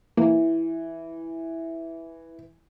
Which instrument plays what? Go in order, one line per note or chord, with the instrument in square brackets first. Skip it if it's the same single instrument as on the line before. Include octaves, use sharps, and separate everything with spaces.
[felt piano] E3 [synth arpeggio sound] A#3